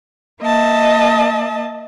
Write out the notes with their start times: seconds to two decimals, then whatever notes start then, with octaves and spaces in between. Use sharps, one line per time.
0.41 A#3 D#5 E5 A5